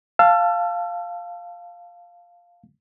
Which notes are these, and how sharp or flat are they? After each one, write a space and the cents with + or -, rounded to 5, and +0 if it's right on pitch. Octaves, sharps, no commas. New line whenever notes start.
F5 +0 A5 +0 E6 +35